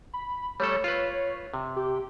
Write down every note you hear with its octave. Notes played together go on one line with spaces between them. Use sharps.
B5
G3 A3 A4 C#5
F4 B4
C3
G4